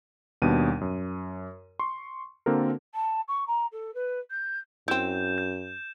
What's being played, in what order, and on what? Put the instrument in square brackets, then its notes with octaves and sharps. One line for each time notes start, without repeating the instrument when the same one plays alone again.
[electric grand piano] D#2 B2 G3 B3 D4 D#7
F#2
C6 C#6
D3 A#3 C4 F#4 A4 A#4
[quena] A5
C#6
A#5
A4
B4
G6
[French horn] F#2 [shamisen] C4 E4 [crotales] G6 E7
[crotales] G6